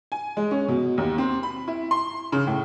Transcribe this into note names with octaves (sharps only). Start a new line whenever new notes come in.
G#5
G#3
C#4
B2
D#2
C4
B5
E4
C6
C#3
A2